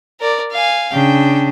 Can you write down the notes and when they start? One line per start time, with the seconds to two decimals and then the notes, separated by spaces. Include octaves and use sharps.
0.20 A#4 D5
0.52 F5 G#5
0.93 C#3 D4 G5